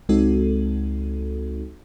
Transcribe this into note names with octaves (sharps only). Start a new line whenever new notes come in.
C#2 G#3 C4 D#4 F#4 A4